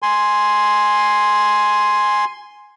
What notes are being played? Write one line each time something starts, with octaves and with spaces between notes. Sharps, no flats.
G#5 C6